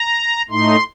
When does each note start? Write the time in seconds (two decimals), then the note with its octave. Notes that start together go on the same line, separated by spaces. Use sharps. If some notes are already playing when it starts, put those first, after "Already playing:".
Already playing: A#5
0.50 A2 A3 D#4 C6